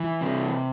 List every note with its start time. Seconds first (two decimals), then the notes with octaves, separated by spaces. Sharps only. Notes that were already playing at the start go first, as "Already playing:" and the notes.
Already playing: E3
0.21 C3